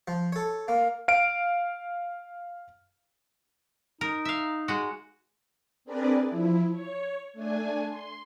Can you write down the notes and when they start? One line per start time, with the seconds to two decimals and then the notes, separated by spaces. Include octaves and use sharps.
0.08 F3
0.32 A4 C#5
0.68 A#3 F5
1.08 F5 D7
4.01 D#4 A#4
4.25 E5 F5
4.68 G#3 F#4
5.85 C4 D4 G#4 A#4 B4 D5
6.26 F3 E4
6.72 C#5
7.33 A3 D4 G#5
7.89 C6